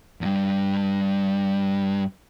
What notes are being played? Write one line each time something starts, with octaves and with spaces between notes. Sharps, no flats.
E2 G2